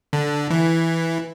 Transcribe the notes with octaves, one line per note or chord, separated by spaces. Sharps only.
D3
E3